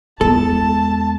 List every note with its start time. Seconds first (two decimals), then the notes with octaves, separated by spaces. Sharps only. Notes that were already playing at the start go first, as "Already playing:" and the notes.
0.21 E2 G#3 A4 A5